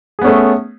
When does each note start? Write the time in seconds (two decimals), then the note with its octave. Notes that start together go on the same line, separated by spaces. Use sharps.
0.19 G#4
0.21 B3
0.24 C#4
0.27 A3